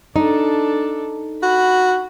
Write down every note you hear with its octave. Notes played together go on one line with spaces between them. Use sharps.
D4 D#4 A4
F#4 B5